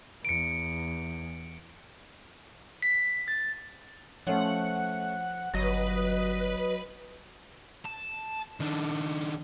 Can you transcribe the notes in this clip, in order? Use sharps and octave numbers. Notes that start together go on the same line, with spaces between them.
E2 C#7 D7
B6
A6
F3 A3 C#4 F#5
G1 F#3 B4 D#5 A#6
A5
D#3 D4